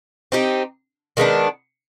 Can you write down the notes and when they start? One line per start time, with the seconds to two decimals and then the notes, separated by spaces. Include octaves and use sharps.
0.32 C4 D#4 G4
1.17 D#3 G#3 B3 D4